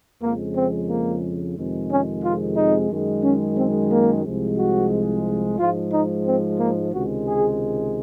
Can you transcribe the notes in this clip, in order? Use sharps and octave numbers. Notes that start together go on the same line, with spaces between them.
F2 C#3 F3 G#3 A#3
C4
A#3
F2 C3 D#3 G#3
C#4
F4
D#4
F#2 D#3 G#3
C#4
C4
A#3
C2 C3 F3 G#3
F#4
G#2 F3 G#3 F4
D#4
C4
A#3
C#2 C3 D#3 G#3 F#4
G#4